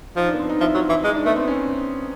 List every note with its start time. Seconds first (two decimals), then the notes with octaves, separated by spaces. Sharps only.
0.16 F3 D#4
0.28 D4
0.34 B3
0.38 C4
0.49 D#4
0.60 F3 E4
0.75 F#3 F4
0.89 E3 E4
1.04 G#3 D#4
1.15 D4
1.25 A3 B3
1.36 C4
1.48 C#4